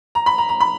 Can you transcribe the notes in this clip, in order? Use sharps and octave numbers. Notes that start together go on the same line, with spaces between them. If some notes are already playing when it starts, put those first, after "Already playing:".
A#5
B5
A#5
A#5
B5